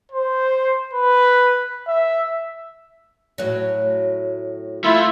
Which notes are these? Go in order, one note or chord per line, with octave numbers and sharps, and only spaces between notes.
C5
B4
E5
A2 F#3
A3 E4 F4 E6